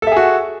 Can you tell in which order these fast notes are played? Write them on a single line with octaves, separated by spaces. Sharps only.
A4 E5 G#4 F#4